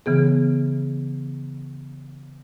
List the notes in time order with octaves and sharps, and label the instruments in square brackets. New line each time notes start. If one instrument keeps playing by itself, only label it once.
[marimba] C#3 E3 B3 G#4